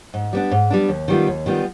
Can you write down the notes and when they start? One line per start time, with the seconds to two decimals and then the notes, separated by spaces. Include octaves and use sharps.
0.14 G#2
0.33 G3 B3 D4
0.51 G#2
0.70 G3 B3 D4
0.89 D#2
1.08 D#3 G3 B3 F4
1.27 D#2
1.46 D#3 G3 B3 F4